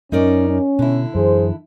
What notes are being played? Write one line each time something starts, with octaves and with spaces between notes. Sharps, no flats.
F#2 C#4 D#4 A#4 D5
C#4
B2 D3 E4
F#2 E3 G#4 C5